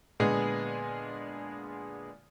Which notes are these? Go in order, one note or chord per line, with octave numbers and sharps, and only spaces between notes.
A#2 D3 G#3 B3 G#4